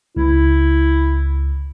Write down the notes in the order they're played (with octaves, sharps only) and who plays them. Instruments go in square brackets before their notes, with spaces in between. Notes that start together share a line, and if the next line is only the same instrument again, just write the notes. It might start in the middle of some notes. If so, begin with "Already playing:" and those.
[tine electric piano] C#2 [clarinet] E4